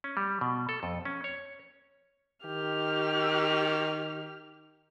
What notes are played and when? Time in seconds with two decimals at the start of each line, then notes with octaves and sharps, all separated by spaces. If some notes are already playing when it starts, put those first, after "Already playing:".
0.04 C#4
0.17 G3
0.41 B2
0.69 A4
0.83 F2
1.05 C#4
1.24 C#5
2.45 D#3 G4 F6